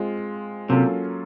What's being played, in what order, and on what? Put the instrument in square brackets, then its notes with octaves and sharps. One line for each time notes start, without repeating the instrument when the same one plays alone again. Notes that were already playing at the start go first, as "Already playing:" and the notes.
Already playing: [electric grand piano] G#3 C4 F4
[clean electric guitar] C3 [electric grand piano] F#3 A#3 C#4 F4 A4